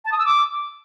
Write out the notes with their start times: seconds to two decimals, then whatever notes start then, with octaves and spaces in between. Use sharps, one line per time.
0.05 A5
0.12 D#6
0.19 E6
0.26 D6